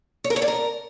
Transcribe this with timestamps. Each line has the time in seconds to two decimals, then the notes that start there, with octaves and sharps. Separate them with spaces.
0.24 C#5
0.30 A#4
0.36 C#5
0.42 D5
0.48 A#4